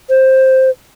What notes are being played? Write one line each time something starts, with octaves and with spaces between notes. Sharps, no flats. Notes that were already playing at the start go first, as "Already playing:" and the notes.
C5